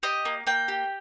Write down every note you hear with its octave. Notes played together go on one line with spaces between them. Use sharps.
G4 D#5
A#3
A#3 G5
G4